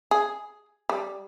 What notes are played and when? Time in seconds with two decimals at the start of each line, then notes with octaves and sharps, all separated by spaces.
0.11 G#4
0.89 G3